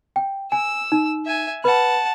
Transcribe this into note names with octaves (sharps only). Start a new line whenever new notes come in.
G5
G#5 E6
D#4
E5 G#5
B4 F#5 A5 B5